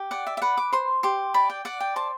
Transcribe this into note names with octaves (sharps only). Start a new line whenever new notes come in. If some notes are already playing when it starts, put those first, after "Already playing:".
Already playing: G4
D5 F#5
E5
E5
B4 F#5
D6
C5 C6
G4 C6
D5 B5
G5
D5 F#5
G5
C5 A5